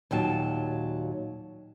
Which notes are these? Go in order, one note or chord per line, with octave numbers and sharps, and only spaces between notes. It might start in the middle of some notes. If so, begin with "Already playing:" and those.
D#2 A#2 F#3 A5